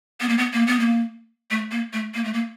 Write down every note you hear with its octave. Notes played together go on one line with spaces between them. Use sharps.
B3
A#3
B3
A#3
B3
A#3
A3
A#3
A3
A#3
A3
A#3